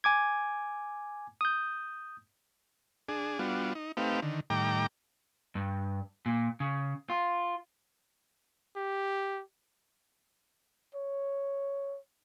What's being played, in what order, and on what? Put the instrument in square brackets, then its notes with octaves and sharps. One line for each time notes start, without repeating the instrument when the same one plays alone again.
[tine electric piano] G#5 D6 G#6
D#6 G6
[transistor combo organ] D4 G#4
G3 B3 D4 F4 F#4
D#4
A3 C4 D#4 G4 B4 F5
D3 D#3
A2 D#3 G3 G5 A#5 D6
[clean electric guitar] G2
A#2
C#3
F4
[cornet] G4
[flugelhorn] C#5